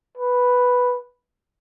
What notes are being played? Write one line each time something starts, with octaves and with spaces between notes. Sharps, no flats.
B4